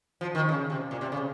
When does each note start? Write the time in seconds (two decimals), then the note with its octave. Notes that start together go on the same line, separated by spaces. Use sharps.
0.21 F3
0.35 D#3
0.49 C#3
0.70 C3
0.91 A#2
1.01 C3
1.12 C#3